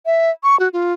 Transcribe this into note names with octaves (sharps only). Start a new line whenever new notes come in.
E5
C#6
F#4
F4